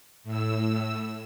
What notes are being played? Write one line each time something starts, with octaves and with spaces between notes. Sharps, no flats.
A2 E6